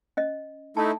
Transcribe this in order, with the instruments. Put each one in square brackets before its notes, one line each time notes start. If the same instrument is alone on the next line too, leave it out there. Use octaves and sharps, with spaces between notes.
[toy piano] C#4 D#5
[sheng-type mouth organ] A3 D#4 E4 [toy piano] A5